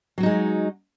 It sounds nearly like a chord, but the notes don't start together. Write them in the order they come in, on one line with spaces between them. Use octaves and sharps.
F#3 F#4 D#4 G#3